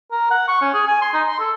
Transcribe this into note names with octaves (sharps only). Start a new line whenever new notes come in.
A#4
F#5
C#6
C#4
G#4
G#5
C6
D#4
C6
A4